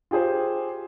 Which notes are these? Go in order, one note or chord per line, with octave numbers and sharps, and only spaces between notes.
F4 G4 G#4 C5